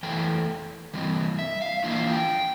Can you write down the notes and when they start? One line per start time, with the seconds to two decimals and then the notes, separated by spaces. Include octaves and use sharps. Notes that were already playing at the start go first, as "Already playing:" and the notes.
0.03 E2 E3 A3 G5
0.94 E3 G3 C4
1.39 E5
1.62 F5
1.80 E5
1.84 E3 A#3 D4 F4 F5
2.07 G5